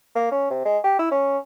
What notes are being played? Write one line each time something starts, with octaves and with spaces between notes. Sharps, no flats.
A#3
C#4
C3
G#3
G4
E4
C#4